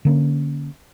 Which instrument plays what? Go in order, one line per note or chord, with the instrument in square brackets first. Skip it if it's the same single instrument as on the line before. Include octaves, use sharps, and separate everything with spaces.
[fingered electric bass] D3 A#3 C#4